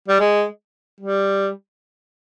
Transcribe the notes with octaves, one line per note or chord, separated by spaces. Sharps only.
G3
G#3
G3